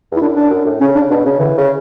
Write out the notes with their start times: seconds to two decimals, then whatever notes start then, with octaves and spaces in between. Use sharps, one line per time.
0.12 E2
0.16 E4
0.21 F#2 D4
0.36 D4
0.50 F#2
0.65 A2
0.80 C#3 C#4
0.95 D4
1.01 C#3
1.10 B2 D4
1.25 C#3 C#4
1.40 D3 E3
1.58 C#3